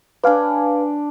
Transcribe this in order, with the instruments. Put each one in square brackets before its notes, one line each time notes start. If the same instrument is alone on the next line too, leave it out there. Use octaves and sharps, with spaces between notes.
[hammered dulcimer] D4 D6 [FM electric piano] B4 F5 G#5